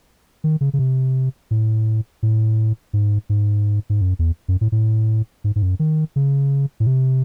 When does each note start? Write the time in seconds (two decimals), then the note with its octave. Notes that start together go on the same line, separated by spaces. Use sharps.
0.44 D#3
0.61 C#3
0.73 C#3
0.79 C3
1.51 A2
2.23 A2
2.93 G#2
3.29 G#2
3.90 G#2
4.01 F#2
4.19 E2
4.48 F#2
4.61 A2
4.72 A2
5.44 G#2
5.56 G#2
5.62 F#2
5.79 D#3
6.16 C#3
6.80 A2
6.87 C3